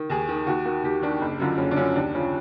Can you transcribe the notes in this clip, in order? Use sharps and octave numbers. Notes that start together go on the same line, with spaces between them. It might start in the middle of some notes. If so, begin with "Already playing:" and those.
Already playing: D#3
D#2 G#4
D#3
D#2 F#4
D#3 F#4
D#2 G4
D#3 D4
F#1
F#2 D3 F3
F#1 C#4
D4
F#2 D3 F3 C#4
D#2 D4
C#3 F3 C#4